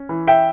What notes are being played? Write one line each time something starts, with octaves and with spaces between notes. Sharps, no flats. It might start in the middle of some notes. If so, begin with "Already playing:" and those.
Already playing: C#4
E3
E5 G5